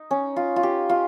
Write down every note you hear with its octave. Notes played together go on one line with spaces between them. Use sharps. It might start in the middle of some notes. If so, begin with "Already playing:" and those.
Already playing: D#4
C#4
F4
F4
G4
F4